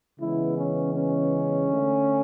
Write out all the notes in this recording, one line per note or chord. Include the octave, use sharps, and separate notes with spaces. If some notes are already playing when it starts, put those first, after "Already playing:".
C#3 E3 G#3 B3 E4
C#4
C#4
D3 A3